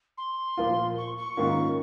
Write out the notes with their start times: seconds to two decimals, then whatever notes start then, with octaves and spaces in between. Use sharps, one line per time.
0.17 C6
0.57 A#2 F3 A#3 F4
0.97 C#6
1.17 C#6
1.37 G#2 D#3 A#3 C#4 F4